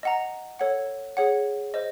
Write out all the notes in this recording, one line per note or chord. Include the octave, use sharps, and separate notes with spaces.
D#5 F#5 A#5
A4 C#5 F#5
G#4 C#5 F#5
C5 D#5